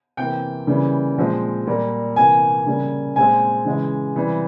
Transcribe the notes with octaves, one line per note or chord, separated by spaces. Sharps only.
C3 E3 A#3 G5
C#3 E3 G3 A#3
A#2 F3 G#3 C4
A#2 G3 A#3
C3 E3 A#3 G#5
C#3 G3 A#3
A#2 G#3 C4 G#5
C#3 E3 G#3
C3 E3 G3